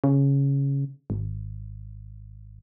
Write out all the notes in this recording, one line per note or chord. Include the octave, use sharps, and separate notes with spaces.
C#3
G#1